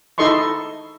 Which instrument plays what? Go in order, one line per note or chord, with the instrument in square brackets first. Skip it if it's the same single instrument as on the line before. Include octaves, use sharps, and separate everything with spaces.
[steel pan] D#4 E4 A4 D#5 C6 C#6